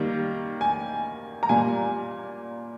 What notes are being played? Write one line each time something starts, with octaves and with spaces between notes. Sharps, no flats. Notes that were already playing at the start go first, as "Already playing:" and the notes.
Already playing: D#3 G3 A#3
G#5
A#5
A#2 G3 A#3 G#5